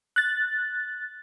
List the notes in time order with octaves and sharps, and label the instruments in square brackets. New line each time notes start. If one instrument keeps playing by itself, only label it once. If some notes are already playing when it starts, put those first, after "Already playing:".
[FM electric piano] F#6 A6